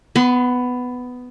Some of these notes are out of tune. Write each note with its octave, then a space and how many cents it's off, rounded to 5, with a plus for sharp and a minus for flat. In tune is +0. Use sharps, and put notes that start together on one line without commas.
B3 +10 C6 -45